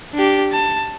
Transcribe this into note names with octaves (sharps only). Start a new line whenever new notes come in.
D4 G4
A5